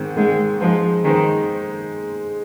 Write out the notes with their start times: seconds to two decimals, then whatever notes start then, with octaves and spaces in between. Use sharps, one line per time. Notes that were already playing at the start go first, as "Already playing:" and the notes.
Already playing: G#2 D#3 C4
0.17 G#2 D#3 G#3 C4
0.60 F3 G#3 D#4 C5
1.04 D#3 G#3 D#4 C5